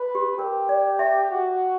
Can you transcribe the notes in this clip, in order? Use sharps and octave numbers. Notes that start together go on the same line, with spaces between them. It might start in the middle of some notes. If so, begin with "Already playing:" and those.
Already playing: B4
G4
G4 A#4
D5
E5
F#4